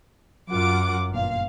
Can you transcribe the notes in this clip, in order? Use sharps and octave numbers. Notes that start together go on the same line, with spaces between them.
F#2 F4 A#4 F#5 D6
G1 A#2 F5